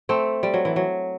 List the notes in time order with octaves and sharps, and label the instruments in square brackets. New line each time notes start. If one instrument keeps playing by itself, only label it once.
[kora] A3 C4
G3
F#3
E3
F#3